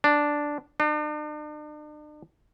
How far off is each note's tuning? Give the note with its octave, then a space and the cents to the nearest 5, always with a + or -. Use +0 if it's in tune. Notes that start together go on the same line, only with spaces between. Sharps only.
D4 +0
D4 +45